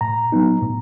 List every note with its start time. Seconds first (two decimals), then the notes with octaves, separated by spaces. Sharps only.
0.01 A2 A#5
0.32 F#3 B3 D#4
0.62 A2